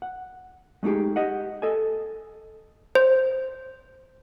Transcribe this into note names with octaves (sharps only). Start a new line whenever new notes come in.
F#5
G#3 A3 D#4 G4 G#4
G4 D#5 F#5
A4 D#5 G#5
C5